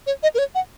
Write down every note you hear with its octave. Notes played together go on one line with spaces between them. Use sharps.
C#5
D#5
A#4
C#5
F#5